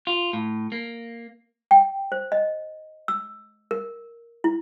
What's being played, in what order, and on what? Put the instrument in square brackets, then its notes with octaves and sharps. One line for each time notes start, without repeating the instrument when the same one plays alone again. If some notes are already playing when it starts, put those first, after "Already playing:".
[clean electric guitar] F4
A2
A#3
[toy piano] G5
C5
D#5
E6
A#4
E4